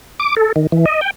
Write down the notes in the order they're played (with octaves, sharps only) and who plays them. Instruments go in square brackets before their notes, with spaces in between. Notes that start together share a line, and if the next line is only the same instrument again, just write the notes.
[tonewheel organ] D6
A4
D#3
E3
D#5
G5